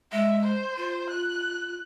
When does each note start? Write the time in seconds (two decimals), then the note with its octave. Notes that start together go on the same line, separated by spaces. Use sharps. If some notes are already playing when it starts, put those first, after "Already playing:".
0.12 G#3 E5
0.44 C5
0.77 F4
1.10 F#6